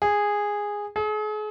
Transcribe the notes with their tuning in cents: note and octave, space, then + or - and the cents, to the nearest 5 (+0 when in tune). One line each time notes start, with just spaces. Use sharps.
G#4 -10
G#4 +40